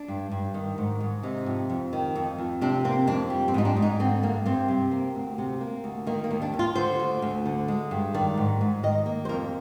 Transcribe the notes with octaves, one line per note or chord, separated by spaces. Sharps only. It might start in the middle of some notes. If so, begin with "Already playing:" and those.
Already playing: D4
G2
G2
D#3
G#2
G#2
C3 D#4
F2
F2
D#3
F2
F2
C3 D4
A#3 C4
F2 D4
G3
C4
G#2 D#4
D4
G#2
D#4
D3 C4
G2 A#3
G2 C4
C3
A#3
D2
C3
A#3
D2
D#3 A#3
A#3
D#2
D4
D#2
F4
D3 C5
D2
D2
D3
G#3
G2
D#3 D5
G#2
G#2
D#3 D#5
A#3
C5
F2 A#4